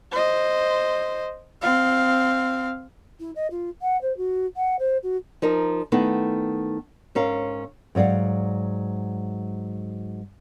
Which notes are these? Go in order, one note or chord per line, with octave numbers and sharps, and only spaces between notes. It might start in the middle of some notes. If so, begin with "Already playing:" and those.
C5 D#5
C4 F5
E4
D#5
F4
F#5
C5
F#4
F#5
C5
F#4
F3 D#4 A#4
D#3 A3 B3 D#4 E4
G#2 C#4 A#4 F5
G#2 F#3 D5 F5 F#5